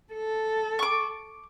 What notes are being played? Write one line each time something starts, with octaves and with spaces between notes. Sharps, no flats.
A4
C#6 D6